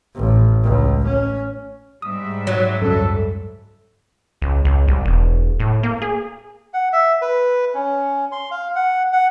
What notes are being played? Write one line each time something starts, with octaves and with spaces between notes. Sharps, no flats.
A1
C#2
C#4
G#2 G3 E5 D#6
F#3
C#2 F#2 A4
C#2
C#2
C2
E1
A2
A#3
G#4
F#5
E5
B4
C#4
C6
F5
F#5
F#5